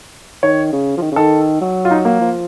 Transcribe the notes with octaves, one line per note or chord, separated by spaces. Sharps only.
D#3 C#5
C#3
F3
D#3
C#3
D#3 A4
F#3
F4
D#4
A#3
F3